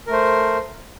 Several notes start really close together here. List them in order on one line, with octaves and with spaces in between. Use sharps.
A#4 A3 C5